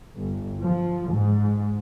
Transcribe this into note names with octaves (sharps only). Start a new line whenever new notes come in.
G1
F3
G#2